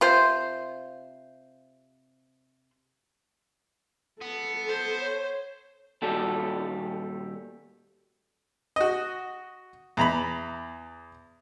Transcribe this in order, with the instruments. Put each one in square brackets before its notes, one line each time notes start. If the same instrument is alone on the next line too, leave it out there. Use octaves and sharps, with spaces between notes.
[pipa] C3 F4 C5
[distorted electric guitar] B3 [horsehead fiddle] A4
[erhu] C5
[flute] C#5
[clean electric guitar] A#2 D#3 G3 F#4 A4
[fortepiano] F#4 D#5
E2 A#5 B5